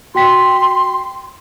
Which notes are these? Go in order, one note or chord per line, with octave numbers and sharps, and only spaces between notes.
F#4 G5 C6 B6